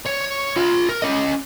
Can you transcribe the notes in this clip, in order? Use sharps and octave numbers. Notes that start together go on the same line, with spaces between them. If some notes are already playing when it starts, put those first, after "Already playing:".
C#5
F4 B5
A#4
C#4 D#5